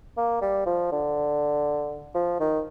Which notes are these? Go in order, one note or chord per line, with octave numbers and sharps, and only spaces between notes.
A#3
G3
F3
D3
F3
D#3